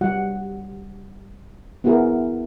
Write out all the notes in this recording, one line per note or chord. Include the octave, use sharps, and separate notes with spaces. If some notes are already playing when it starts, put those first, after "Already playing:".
G3 F#4 F#5
B3 E4 F#4 G#4 A#4